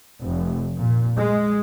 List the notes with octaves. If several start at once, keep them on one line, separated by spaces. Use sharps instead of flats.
F1
A#2
G#3